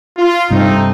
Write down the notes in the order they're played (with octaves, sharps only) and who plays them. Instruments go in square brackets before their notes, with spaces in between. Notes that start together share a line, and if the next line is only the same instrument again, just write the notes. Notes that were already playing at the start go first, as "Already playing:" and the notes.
[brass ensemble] F4
[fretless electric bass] G2 C3 [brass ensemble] A3 C4 D#4